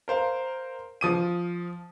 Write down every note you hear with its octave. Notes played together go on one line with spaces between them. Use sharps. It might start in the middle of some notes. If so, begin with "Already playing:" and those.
A#4 C5 F5
F3 D#6 D#7